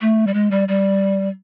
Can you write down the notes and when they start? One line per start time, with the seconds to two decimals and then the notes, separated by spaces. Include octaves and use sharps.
0.01 A3
0.27 G3
0.34 G#3
0.51 G3
0.68 G3